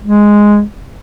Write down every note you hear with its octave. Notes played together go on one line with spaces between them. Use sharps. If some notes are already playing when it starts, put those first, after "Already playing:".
G#3